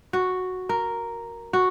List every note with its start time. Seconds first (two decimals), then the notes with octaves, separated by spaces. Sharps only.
0.13 F#4
0.69 A#4
1.53 F#4